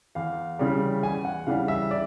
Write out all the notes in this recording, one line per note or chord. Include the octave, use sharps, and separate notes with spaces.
E2 F5
C#3 E3 G3
E2 G#5
F#5
C#3 E3 G3 F5
E5
D5